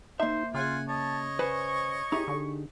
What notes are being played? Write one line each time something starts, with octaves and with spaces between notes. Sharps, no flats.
A#3 D#4 C5 E5
C#3 F4 F#5 G#5
C#5 D#5 A5
B4 C5 G#5 C#6
D#4 E4 G4 G#4
D3